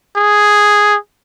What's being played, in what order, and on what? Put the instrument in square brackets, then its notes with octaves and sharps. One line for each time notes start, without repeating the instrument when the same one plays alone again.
[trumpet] G#4